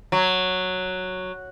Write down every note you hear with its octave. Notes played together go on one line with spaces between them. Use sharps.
F#3